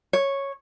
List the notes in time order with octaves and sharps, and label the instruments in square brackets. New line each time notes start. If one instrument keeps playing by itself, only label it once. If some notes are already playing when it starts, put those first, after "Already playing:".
[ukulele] C#5